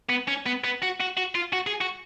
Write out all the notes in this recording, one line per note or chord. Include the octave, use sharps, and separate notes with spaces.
B3
C#4
B3
B3
F#4
F#4
F#4
F4
F#4
G#4
F#4